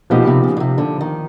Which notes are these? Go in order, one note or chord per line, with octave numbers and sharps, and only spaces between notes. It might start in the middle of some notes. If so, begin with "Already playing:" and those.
B2 F3 A#3 D#4 G4
C3
C#3
B2
C3
D3
D#3